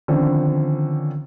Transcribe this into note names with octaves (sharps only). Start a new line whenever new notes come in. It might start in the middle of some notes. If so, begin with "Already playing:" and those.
D3 D#3 F3 C4 C#4